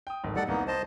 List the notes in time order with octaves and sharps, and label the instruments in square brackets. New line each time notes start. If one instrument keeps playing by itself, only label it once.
[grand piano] G5 D#6
D1 G#1
[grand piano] G3 D#4 [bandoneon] A4 D5 F#5
[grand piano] C2 [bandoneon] A#3 B3 D#4
[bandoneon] C5 D#5 A5